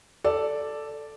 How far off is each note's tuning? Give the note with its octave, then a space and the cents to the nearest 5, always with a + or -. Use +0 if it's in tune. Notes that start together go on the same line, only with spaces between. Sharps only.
A4 +0 D5 +0